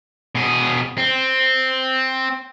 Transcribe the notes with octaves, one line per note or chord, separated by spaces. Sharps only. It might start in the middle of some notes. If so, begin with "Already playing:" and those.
B2 G#4
C4